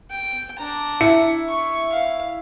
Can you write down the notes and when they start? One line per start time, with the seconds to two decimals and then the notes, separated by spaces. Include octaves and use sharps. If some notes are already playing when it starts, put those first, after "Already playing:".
0.11 G5
0.58 D4 A#5
1.01 E4 C#7
1.49 C#6
1.93 F5